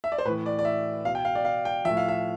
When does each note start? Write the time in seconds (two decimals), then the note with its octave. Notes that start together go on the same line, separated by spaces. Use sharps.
0.04 E5
0.12 D5
0.18 C5
0.25 A2 B4
0.30 E3
0.46 D5
0.59 D5
0.65 E5
1.05 B2 F5
1.15 G5
1.25 F5
1.35 D5
1.45 F5
1.65 G5
1.85 A2 F3 E5
1.97 F5
2.08 E5